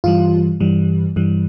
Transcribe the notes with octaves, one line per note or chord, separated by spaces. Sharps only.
G2 E3 G3 F4
G2 E3 G3
G2 E3 G3